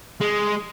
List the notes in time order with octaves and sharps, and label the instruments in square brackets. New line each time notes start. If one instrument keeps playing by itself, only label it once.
[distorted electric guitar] G#3